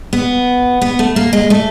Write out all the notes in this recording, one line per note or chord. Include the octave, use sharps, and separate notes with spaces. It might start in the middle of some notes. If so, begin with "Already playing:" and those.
B3
B3
A3
A#3
G#3
A3